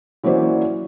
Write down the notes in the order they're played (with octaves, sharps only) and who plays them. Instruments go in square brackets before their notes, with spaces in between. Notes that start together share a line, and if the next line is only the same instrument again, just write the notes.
[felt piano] E3 F#3 A#3 C#4 C5 D5